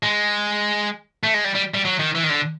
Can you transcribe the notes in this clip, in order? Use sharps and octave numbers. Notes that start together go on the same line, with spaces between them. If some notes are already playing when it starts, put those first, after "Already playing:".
G#3
A3
G#3
G3
G3
G3
F#3
D#3
E3
D#3
D3